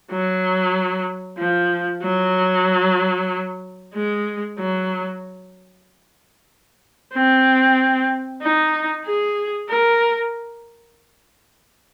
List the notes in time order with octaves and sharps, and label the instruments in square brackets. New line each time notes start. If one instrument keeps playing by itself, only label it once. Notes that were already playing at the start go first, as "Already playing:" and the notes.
[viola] F#3
F3
F#3
G#3
F#3
C4
D#4
G#4
A#4